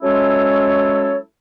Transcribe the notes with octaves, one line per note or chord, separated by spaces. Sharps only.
F#3 G#3 C#4 E4 A4 C#5